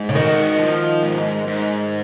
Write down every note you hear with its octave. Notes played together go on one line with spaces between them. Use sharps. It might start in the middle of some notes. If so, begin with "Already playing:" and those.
Already playing: G#2
C#3
D#3 F#4
F3
G#2
G#2